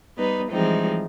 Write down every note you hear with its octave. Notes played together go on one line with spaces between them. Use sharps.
G3 B3 D#4 B4
E3 F3 G3 G#3 C4 D#4